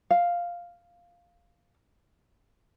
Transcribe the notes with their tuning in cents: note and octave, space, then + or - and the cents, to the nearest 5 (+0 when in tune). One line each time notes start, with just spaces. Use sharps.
F5 +0